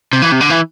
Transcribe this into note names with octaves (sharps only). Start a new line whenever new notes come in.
C3
E3
C3
D3
E3